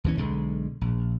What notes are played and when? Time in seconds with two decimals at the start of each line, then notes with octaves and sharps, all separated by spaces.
0.04 D#2 E3 C#4
0.17 B1 D3 G#3
0.81 A#1